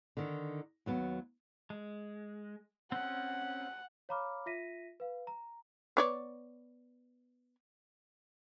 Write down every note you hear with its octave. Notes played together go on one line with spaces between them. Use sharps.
D3 D#3
D#2 F#3 B3
G#3
C4 C#4 F#5
C#5 F5 A#5 B5 D6 F6
F4 E5 A#6 B6 D#7
B4 F5
A#5
B3 C#5 D5